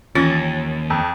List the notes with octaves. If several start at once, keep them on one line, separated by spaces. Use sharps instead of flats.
D#2 E3 C#4 F4 A6 A#6
F2